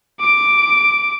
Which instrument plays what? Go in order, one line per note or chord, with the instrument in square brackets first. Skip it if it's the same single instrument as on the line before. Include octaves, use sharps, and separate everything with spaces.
[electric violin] D6 D7